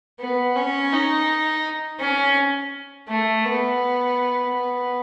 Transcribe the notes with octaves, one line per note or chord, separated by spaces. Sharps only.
B3
C#4
D#4
C#4
A3
B3
B3